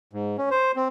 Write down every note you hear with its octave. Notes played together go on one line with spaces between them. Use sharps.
G#2
C#4
C5
C4